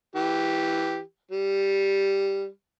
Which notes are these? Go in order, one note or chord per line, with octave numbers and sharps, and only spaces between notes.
E3 G4
G3